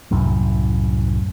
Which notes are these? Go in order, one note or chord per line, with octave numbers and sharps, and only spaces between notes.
C2 F#2 A2